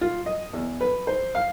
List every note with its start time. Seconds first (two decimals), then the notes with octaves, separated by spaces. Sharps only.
0.01 F4
0.26 D#5
0.53 E2
0.81 B4
1.07 C5
1.35 F5